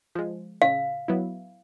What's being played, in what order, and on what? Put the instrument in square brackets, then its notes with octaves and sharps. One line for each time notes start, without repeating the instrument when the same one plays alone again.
[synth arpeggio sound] F3 G#3
[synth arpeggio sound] C#3 [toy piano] F5
[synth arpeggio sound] F#3 B3 E4